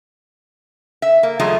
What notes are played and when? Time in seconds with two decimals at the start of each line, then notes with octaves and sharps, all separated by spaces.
1.02 E5
1.23 A#3
1.39 E2 F#3 A3 F4 G#4 D#5